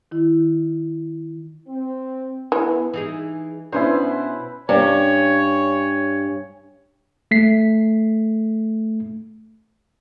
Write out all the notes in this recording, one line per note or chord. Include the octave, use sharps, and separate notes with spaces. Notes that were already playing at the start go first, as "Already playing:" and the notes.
D#3 E4
C4
E3 B3
E3 D#4 G#4
B2 B3 C#4 D4 E4 B4 C5
G2 C#4 C#5
A3 B6 C7